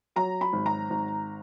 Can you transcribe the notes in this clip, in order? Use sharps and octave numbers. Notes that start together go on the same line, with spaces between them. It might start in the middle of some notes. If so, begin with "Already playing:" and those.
F#3 A#5
B5
G#1
A#5
G#1